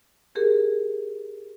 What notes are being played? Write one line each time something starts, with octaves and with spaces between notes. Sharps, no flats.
G4 G#4 A#4